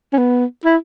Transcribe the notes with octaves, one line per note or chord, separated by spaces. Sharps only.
C#4
B3
E4